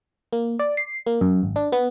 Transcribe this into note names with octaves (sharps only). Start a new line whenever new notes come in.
A#3
D5
C7
A#3
F#2
G#1
D4
B3